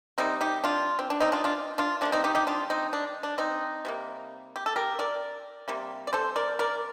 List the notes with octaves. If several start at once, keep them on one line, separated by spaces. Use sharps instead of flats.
C3 G3 A#3 C4 D#4
D#4 G4
D4 F4
C4
D4
C4 D#4
D4 F4
D4 F4
D4 F4
C3 F3 A#3 D4
C4 D#4
D#4 G4
D#4 G4
D4 F4
C4 D#4
D4
D4
C4 D#4
C3 G3 A#3
G4
A4
G4 A#4
A#4 D5
C3 G3 A#3
D5
A4 C5
A#4 D5
A#4 D5